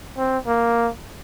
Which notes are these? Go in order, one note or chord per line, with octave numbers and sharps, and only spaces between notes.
C4
A#3